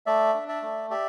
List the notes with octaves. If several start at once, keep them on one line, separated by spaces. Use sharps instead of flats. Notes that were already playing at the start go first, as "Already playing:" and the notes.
A3 D5 E5
D4
D5 E5
A3
G4 D5 E5